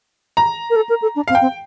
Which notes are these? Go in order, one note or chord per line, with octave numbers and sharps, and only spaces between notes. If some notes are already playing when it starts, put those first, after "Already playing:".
A#5
A#4
A4
A#4
A4
D4
C4 F5
G5
C4